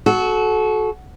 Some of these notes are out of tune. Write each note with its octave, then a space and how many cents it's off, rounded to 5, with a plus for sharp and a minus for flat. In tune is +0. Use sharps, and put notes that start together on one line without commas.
F#4 +0 A4 -30